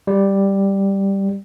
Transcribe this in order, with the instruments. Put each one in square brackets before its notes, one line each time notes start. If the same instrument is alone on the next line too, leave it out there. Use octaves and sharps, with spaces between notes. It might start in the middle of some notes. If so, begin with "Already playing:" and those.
[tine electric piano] G3